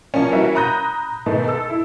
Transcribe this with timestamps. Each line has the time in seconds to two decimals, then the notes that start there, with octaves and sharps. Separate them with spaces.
0.14 F3 A#3 C#4
0.31 E3 G3 A#3 C#4 F#4 E5
0.55 A#5 B5 D#6 F#6 G6 A#6
1.26 G#2 B2 D#3 A3 B3
1.48 A4 E6
1.70 E4